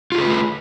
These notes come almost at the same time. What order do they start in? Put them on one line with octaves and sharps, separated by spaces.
F4 G4 G#4 B4 A3